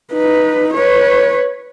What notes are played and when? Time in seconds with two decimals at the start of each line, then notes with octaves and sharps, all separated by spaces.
0.13 D#4 B4
0.74 B4 C#5